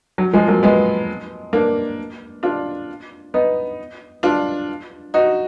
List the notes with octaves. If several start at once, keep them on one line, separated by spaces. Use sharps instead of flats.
F#3
F3 G#3
F#3 A#3
G#3 B3
A#3 D4
D4 F4
B3 D#4
D4 F4
D#4 F#4